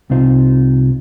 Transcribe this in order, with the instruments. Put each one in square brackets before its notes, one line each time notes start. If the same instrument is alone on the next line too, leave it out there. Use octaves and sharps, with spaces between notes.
[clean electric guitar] C2 C3 D#4 F4 C5